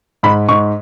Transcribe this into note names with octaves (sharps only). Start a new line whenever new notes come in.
G#2 B5
G#2 C#6